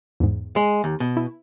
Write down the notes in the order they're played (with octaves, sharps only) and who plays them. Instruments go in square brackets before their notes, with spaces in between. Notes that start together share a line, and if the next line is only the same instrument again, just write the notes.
[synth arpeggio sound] E2 G#2
[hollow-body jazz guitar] G#3
D#2
B2
[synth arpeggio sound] E4